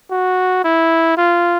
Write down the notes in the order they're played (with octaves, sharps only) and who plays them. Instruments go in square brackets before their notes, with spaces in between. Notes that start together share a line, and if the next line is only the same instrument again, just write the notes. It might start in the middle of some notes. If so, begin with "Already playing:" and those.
[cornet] F#4
E4
F4